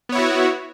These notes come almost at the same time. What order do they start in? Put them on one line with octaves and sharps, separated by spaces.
B3 C#5 E4 F#4